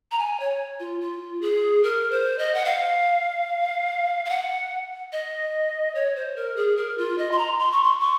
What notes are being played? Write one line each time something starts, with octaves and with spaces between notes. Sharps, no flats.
A#5
G#5
C#5
F4
F4
G#4
A#4
C5
D#5
F#5
F5
F5
F#5
D#5
C#5
C5
A#4
G#4
A#4
F4
D#5
C6
A#5
C6
C#6
C6
C#6